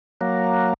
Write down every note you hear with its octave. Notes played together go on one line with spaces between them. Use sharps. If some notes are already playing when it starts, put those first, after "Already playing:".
F#3 A#3